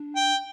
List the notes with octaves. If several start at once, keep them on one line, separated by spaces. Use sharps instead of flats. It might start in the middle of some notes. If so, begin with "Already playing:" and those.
Already playing: D4
G5